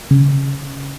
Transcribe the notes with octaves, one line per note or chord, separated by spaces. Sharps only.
C#3